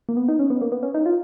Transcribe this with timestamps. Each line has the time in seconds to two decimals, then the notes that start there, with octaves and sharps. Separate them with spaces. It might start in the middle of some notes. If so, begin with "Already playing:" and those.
0.09 A#3
0.17 B3
0.28 D#4
0.39 C#4
0.50 B3
0.61 A#3
0.72 B3
0.83 C#4
0.94 D#4
1.06 F4